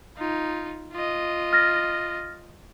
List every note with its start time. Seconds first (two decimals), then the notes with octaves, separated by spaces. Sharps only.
0.17 D#4 F4
0.93 F4 D#5
1.53 F6 A6 A#6